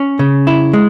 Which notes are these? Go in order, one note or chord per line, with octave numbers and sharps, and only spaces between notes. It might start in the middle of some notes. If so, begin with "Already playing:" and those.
Already playing: C#4
C#3
E4
G#3